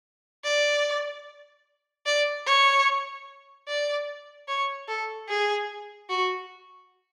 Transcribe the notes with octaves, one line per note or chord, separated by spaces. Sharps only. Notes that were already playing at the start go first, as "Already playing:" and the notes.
D5
D5
C#5
D5
C#5
A4
G#4
F#4